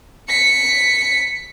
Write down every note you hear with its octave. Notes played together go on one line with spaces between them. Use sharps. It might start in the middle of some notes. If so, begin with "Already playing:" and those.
B6 C#7